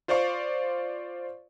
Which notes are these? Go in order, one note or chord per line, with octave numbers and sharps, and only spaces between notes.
F4 C5 D5 F5 C#6